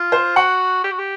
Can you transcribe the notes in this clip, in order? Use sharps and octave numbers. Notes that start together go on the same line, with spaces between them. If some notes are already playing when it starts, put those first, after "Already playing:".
Already playing: F4
C5
F#4 F#5
G4
F#4
G4